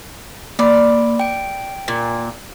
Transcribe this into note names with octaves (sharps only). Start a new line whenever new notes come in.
A#3 D5 B5
G5 D7
A#2